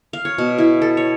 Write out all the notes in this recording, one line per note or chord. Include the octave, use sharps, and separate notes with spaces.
F5
C#5
B2
E4
A4
C#5